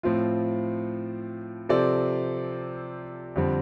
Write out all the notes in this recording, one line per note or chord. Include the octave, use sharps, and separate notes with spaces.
A2 F3 C4 F4
C3 F3 C4 A4 D5
F2 D3 G3 C4